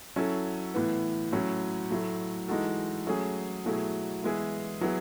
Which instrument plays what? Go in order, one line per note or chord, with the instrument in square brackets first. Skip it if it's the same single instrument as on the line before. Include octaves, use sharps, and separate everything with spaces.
[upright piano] F#3 C#4 E4 A4
A2 E3 B3
A2 F#3 C#4
A2 F#3 A3
E3 G#3 D#4 F#4 A4
F#3 A3 C#4 G#4
B2 F#3 A3 E4 G#4
E3 G#3 B3 E4 G#4
F#3 B3 E4 G#4